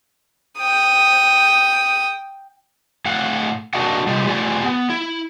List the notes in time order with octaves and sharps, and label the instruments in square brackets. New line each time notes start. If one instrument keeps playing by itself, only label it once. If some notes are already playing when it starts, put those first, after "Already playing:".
[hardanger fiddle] G5 D#6
[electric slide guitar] A2 F5 F#5
A#3 D4 F#4 D#5 F5 F#5
C3 G3 F4 G4 D#5
A3 F4 G4 D5 F#5 G#5
B3
E4